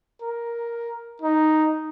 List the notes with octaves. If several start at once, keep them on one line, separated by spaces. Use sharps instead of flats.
A#4
D#4